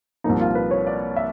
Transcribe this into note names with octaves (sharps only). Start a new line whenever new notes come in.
C2 A#2 F3 A#3 D#4
F4
B4
C#5
D5
E5